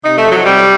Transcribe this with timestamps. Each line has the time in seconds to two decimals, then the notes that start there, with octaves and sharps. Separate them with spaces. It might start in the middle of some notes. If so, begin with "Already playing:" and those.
0.04 C3 D#4
0.17 A3
0.25 F3
0.31 F#3
0.45 C3 G3